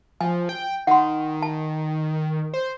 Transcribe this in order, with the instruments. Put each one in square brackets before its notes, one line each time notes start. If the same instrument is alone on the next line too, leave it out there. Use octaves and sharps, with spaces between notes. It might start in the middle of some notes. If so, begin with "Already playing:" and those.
[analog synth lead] F3 [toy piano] G#5
[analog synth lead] G5
[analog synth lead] D#3 [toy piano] F#5 C6
[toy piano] A5
[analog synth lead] C5